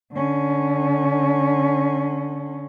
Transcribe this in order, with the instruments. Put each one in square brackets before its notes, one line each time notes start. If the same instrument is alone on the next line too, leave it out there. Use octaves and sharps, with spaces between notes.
[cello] D3 C#4